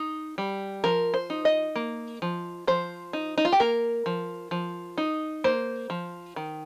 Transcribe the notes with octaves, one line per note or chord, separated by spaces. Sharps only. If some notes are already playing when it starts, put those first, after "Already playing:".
Already playing: D#4
G3
F3 A#4
C5
D#4
D#5
A#3
F3
F3 C5
D#4
D#4
F4
G4
A#3 A#4
F3
F3
D#4
A#3 C5
F3
D#3